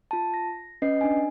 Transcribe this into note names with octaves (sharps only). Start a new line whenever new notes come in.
F4 A5
A#6
C#4 B4 D#5 C7
D4 G#5